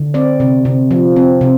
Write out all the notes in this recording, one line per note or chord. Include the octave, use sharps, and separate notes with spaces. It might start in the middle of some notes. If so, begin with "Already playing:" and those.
Already playing: D3
C4 D5
C3
C3
F3
C4
C3